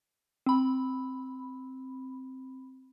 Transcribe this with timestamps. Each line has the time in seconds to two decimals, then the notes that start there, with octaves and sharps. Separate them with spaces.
0.46 C4 B5